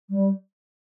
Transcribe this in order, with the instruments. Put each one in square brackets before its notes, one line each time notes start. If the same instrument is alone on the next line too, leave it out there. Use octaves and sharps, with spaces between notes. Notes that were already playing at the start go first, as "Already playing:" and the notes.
[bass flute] G3